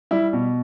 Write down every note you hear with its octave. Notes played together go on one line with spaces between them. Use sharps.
G3 E4 E5
B2